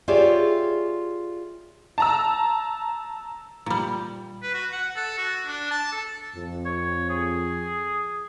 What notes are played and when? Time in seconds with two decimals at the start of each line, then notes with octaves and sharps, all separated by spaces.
0.08 F4 G4 G#4 C#5 D5 E5
1.98 A5 A#5 E6
3.66 A#2 G3
4.43 B4
4.54 F#4
4.72 F#5
4.96 A4
5.18 F#4
5.46 D4
5.71 A5
5.92 A4
6.35 F2
6.66 C#5
7.10 G#4